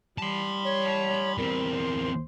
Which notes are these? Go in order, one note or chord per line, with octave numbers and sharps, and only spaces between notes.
G3 A5 B5 C6
C#5
E2 C4 A#4
C5